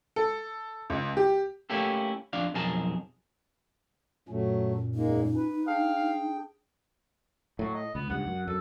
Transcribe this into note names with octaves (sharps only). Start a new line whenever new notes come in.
A4
C#2
G4
A3 A#3 C#4 E4 G4 A4
F2 D4 F5
B1 F2 G#4 A#4 A5
F#2 A#2 F#3 A3 C#4
E2 G#3 A#3 D#4
B4
D4 G#4 F5 G5
A2 F#3
D#5
C#2 B3
C#2 G2 F#5
F#2
F#2 A4